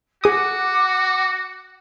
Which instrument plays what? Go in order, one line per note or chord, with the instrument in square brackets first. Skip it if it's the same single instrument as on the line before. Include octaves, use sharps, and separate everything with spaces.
[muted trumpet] F#4 [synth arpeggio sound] G#4 D#6 [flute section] F#5 D6